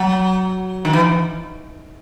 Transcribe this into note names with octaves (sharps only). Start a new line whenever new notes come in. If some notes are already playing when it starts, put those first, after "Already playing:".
Already playing: F#3
D#3
E3